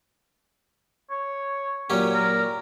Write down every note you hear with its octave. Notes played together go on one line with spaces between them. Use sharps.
C#5
A#2 F#3 C#4 G4
A#4